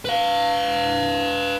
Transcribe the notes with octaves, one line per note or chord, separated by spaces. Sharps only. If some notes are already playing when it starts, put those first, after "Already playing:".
B4 F5